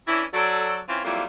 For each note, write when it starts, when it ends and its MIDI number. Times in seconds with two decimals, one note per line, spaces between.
0.07 0.24 52
0.07 0.24 61
0.07 0.24 62
0.07 0.24 64
0.34 0.78 54
0.34 0.78 69
0.34 0.78 74
0.88 1.00 52
0.88 1.00 60
0.88 1.00 61
0.88 1.00 65
1.04 1.23 41
1.04 1.23 54
1.04 1.23 55
1.04 1.23 58
1.04 1.23 64
1.04 1.23 65